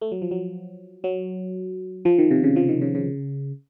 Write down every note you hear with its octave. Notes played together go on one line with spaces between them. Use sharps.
A3
F#3
F3
F#3
F#3
F3
D#3
C3
C#3
F3
D#3
C#3
C#3